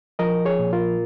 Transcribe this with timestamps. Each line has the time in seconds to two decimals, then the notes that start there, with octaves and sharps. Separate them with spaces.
0.19 F3 A#4 D#5
0.45 G#4 C#5
0.59 A#2
0.73 F4 A#4